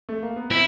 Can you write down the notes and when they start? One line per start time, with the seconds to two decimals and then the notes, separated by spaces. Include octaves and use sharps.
0.09 A3
0.23 A#3
0.36 B3
0.50 C4 E4